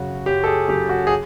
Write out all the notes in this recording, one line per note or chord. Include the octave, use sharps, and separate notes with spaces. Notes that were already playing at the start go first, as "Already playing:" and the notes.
Already playing: F#2 C#3 F#3 F#4
F#2 G4
A4
G#4
C#3 F#3 G4
F#4
G#4